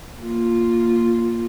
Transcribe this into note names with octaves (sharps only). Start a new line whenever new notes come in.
A#3 F4